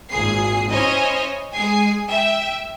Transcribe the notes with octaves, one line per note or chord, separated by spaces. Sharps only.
G#1 A#2 G#4 C7
C#4 E4 C5 C#5 D#5 G#5
G#3 G#4 G#5 C7
E5 G5